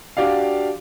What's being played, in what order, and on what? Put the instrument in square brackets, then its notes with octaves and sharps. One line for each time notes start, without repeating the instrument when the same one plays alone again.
[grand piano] D4 F#4 G4 D5 F5